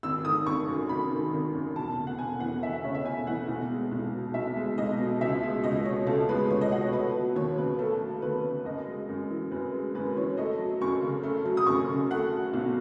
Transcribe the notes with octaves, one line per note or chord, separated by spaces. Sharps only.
G#1 E6
D#3 D#6
G#1 C#6
F#2
G#1 B5
D#3
G#1
F#2
E1 A5
C#3
F#5
E1 G#5
E2 F#5
E1 E5
E5
C#3 C#5
E5
E1 G#5
E2 F#5
B1
G#3
B1
B2
B1 E5
G#3
B1 D#5
B2
C#2 E5
G#3
C#2 D#5
B2 C#5
C#2 A4
G#3 B4
C#2 C#5
D#5
B2 F#5
C#5
A3 B4
F#3
D#2 C#5
C#3 B4
A3 A4
F#3
D#2 B4
C#3
F#2 D#5
G#3
F#2
E3
F#2 B4
G#3
F#2 B4
E3 C#5
A3 D#5
F#3
F#2 C#6
C#3
A3
F#3
D#6
F#2 C#6
C#3
A3 F#5
F#3
B1